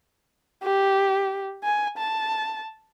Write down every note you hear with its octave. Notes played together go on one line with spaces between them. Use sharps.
G4
G#5
A5